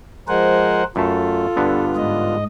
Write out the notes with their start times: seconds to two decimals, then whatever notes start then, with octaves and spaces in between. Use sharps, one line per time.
0.28 F3 G#3 A#4 C5 F#5 G#5
0.96 F#2 A3 F4 A4 A5
1.56 G2 D3 B3
1.96 G#2 D#5